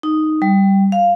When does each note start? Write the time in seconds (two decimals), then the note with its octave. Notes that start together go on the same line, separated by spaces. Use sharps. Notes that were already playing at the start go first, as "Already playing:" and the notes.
0.03 D#4
0.42 G3
0.92 F5